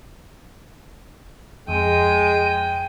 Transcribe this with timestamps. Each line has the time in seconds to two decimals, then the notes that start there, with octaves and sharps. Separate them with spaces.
1.68 F2 G#3 G5 D#7